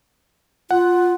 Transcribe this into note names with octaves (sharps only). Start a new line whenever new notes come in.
F4 F#5